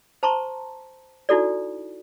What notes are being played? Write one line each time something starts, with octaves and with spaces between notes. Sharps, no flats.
C5 A5 A#5 C6 C#6
D#4 E4 F#4 A4 D5